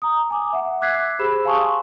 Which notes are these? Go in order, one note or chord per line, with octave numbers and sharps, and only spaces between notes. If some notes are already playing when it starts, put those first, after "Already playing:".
A#5 D#6
G#5 D6
E5 F#5
D6 E6 F#6 G#6 B6 C7
G4 G#4 C5 B5 E6 E7
F5 G#5 A5 C6 C#6 D#6